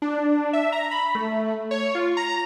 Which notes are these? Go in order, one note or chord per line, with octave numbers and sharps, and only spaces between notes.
D4
E5
A#5
B5
A3
C#5
F4
A#5